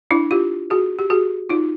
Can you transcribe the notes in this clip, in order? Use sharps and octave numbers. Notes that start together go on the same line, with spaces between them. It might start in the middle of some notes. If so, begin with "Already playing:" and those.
D4 E4
F4 G4
F#4 G#4
G4
F#4 G#4
D#4 F4